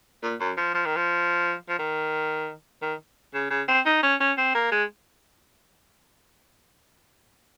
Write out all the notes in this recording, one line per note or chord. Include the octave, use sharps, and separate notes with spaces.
A#2
F#2
F3
F3
D#3
F3
F3
D#3
D#3
C#3
C#3
C4
D#4
C#4
C#4
C4
A#3
G#3